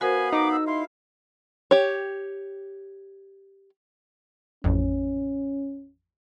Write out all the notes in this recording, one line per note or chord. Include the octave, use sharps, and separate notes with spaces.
B3 F#4 A#4 C5 F5 G#5 B5
D#4 D6
E6
E4 F5 C6
G4 C#5
A1 F2 C#4